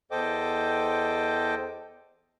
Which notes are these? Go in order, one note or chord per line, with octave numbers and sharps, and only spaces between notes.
E2 A4 C5 D#5 G5 D6